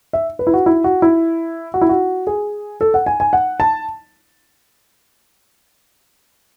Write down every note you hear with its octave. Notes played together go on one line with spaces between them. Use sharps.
E5
B4
E4
F#4
E4
F#4
E4
F#4
E4
F#4
G#4
A4
F#5
G#5
G#5
F#5
A5